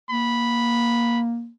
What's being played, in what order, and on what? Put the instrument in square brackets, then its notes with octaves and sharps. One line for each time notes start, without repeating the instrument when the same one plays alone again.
[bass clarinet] A#3 [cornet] B5